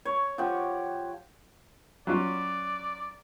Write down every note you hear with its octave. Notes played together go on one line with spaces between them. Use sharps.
C#5
F3 G4 F#5
F#3 C#4 F4 D5